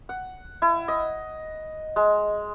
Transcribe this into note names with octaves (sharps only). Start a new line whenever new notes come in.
F#5
E4
D#5
G#3